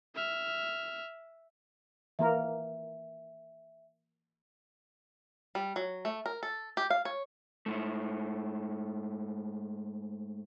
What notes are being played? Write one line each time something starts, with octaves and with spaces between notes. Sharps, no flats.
E5 F6
E3 A#3 A#4 E5
G3
F#3
A3
A#4
A4
G4
F5
C#5
G#2 A3